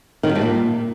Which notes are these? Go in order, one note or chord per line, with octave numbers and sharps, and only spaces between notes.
D#3
F#2
G2
A#2